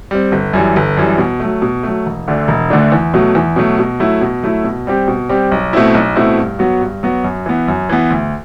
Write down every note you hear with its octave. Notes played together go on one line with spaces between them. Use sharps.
G3 C4
G1
F#2 E3 G3
G1
F#2 E3 G3
B2
F#3 A3
B2
F#3 A3
E1
D2 D3 A3 D4
E1
D2 D3 A3 D4
E2
B2 F#3 A3
E2
B2 F#3 A3
B2
F#3 A3 E4
B2
F#3 A3 E4
B2
G3 C4 G4
B2
G3 C4 G4
B1
B2 A3 C4 E4
B1
B2 A3 C4 E4
G2
F#3 B3 F#4
G2
F#3 B3 F#4
F#2
E3 B3
F#2
E3 B3
D2